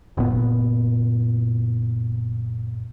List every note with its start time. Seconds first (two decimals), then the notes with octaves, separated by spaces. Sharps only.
0.17 F#1 A#2 B3